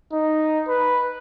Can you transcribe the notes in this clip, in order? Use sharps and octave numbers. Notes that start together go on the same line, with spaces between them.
D#4
B4